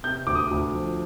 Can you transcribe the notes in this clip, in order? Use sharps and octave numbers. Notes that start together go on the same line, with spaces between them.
C3 G6
D2 D6
D#6
D2
F3